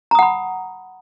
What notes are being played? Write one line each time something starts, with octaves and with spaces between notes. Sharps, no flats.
F#5 A#5 B5 D#6